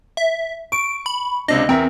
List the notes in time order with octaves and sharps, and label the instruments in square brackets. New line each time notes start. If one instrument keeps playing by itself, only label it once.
[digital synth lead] E5
[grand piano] C#6 [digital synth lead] D7
[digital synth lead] B5
[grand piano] C#2 C3 D4 [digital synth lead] D#5
[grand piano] E2 A#4 E5 [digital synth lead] C4